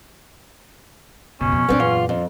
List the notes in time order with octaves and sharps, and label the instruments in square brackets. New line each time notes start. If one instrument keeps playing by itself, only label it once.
[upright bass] F#1 C#2 [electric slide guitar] B2 [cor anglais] C#4
[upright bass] F2
[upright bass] F#2 A#2 [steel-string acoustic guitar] B3 C4 D4
[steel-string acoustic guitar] E2 [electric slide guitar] F4
[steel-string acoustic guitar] F2 [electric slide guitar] F3